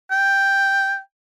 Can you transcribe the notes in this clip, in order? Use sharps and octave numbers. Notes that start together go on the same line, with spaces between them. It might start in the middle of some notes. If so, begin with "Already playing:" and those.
G5